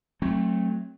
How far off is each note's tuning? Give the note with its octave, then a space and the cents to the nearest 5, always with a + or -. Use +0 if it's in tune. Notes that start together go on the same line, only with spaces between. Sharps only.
F#3 +0 A3 +0 C4 +30